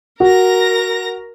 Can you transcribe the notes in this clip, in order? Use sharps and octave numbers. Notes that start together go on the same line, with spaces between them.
F#4 A#4 A#5 A#6